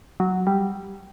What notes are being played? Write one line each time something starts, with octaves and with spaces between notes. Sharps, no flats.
F#3
G3